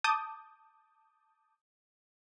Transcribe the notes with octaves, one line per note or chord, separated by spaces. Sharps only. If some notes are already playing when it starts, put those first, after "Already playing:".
A5 D6 D#6 G6